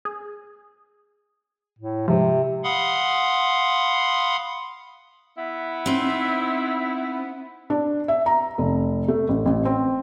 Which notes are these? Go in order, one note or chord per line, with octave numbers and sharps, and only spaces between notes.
G#4
A2
G#2 C3 F3
F5 F#5 B5 C6 D#6
B3 E4
C4 D#4
D4
E5
A#5
F1
A3
A1
A1
C4